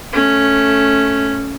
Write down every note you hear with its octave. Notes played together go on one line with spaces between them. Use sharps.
A3 C#4